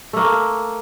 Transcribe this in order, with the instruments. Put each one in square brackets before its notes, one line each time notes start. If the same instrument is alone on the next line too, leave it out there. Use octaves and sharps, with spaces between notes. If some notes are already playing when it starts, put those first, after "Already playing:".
[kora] A3 A#3